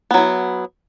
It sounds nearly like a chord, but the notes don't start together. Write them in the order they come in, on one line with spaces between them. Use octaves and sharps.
B3 F#3 E4